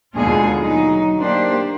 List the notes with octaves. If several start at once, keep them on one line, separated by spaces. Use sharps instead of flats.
D#2 B2 D3 G#3 F4 G#4
F#3 D#4
A#3 D4 G4 C5